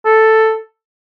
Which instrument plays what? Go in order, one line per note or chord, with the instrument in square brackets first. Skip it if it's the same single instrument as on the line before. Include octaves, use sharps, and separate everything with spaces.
[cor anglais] A4